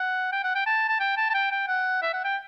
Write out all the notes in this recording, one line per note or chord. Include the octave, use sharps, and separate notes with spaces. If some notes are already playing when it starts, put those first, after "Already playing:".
Already playing: F#5
G5
F#5
G5
A5
A5
G5
A5
A5
G5
G5
F#5
E5
F#5
G5